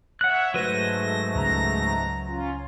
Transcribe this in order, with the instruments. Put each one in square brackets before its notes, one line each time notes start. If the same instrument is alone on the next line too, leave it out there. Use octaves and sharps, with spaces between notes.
[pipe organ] C#5 E5 [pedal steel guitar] F#5 F#6
[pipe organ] G#2 A3 A#6 [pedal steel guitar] F#3 B4 C5
[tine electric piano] C#2 [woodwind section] A#5
[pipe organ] C#4 F4